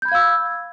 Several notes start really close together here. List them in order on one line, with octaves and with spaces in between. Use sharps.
G6 B5 G#6 F5 E6